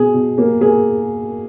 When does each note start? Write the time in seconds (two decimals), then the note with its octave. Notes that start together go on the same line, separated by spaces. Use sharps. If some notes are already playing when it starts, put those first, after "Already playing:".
Already playing: B2 G#4
0.14 B2
0.38 A#3
0.61 A#3 G#4